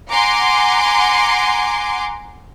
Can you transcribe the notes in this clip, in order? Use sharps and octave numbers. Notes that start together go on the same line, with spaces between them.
F#5 G#5 A#5 C6 D6